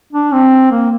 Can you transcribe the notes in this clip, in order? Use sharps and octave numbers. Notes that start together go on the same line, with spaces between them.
D4
C4
A#3